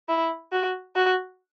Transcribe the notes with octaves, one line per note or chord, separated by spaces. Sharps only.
E4
F#4
F#4